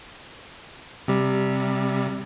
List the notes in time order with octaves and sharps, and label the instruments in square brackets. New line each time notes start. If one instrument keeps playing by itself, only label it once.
[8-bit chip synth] C3 G3